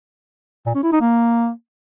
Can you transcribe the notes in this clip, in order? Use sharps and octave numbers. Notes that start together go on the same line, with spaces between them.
A#2
C#4
E4
D#4
A#3